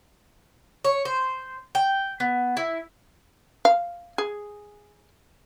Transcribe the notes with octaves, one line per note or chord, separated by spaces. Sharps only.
C#5
C5
G5
B3
E4
F5
G#4